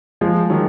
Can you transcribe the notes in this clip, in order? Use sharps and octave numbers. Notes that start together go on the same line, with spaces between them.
F3 G#3
D#3 F#3